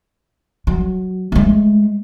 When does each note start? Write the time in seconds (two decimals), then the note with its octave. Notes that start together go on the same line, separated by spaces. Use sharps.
0.67 F#3
1.32 G#3 A3